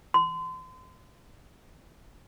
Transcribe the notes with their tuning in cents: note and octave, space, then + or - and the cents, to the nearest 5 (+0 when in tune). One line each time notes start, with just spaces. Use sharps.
C6 -35